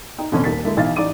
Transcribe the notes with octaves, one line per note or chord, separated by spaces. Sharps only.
D#4 G5
F2 B2 D3 E3 A3 C#4
D#1 D#2 A#3 D#4 A6 B6
D3 G#3 A#3 E4
B1 E3 E4 D#5 F5 A6
A1 E3 D#4 D5 D6 D#7